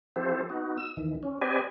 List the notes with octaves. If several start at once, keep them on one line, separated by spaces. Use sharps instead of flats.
F3 C4 E4 G4 A4 C5
B3 D#4 F#4
E6
D#2 D#3 E3
C#4
C4 G4 B4 D5 D#5 G#5